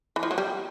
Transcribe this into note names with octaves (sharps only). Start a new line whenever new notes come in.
E3
F3
F#3
G3